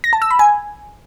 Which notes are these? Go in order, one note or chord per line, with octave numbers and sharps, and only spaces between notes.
A#6
A5
E6
B5
G#5